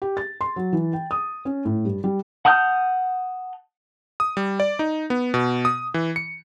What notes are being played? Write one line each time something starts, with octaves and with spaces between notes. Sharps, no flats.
G4
A6
C6
F#3
E3
G5
D#6
C#4
A2
G2
G3
F#5 A5 D#6 F6 G6
D#6
G3
D5
D#4
B3
B2
D#6
E3
C#7